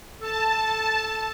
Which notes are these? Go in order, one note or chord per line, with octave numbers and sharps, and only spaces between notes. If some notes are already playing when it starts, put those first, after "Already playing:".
A4 A5